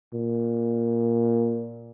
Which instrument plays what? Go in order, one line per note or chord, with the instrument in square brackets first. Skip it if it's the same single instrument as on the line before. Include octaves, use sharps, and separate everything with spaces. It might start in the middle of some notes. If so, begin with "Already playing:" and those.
[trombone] A#2